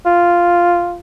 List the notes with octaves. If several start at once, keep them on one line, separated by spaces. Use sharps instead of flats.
F4